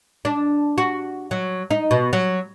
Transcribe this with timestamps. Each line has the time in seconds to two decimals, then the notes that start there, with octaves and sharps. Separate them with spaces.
0.25 D4
0.78 F#4
1.31 F#3
1.70 D#4
1.91 B2
2.13 F#3